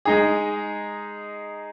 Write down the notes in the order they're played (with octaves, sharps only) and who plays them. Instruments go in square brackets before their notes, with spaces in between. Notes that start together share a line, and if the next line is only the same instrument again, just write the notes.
[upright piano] G#3 D#4 G#4